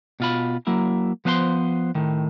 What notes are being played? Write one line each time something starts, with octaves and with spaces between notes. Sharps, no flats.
B2 F4 B5
F#3 A#3 E4
F3 B3 B4 C5 A5 C6
A2 D#3